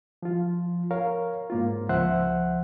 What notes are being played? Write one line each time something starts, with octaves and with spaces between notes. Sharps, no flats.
F3 F4
A#4 C#5 F5
G#2 A#3 F4
C#2 F3 C5 E5 F#5 F#6